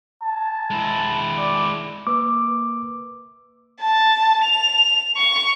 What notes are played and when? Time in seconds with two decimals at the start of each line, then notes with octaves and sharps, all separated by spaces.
0.22 A5
0.70 G#3 E4
1.38 D5
2.07 A#3 B4 D6 E6
3.81 A5
4.44 F7
5.17 C#6